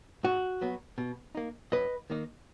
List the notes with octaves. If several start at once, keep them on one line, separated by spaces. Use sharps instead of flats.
G#2 F#4
F#3 B3
B2
A#3 D#4
F#2 B4 D#5
D#3 A#3 D#4